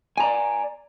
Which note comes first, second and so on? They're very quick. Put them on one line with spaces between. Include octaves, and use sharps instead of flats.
G#5 A#5 D5